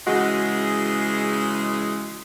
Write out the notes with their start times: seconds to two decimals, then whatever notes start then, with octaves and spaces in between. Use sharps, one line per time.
0.07 C#3 E3 G#3 F#4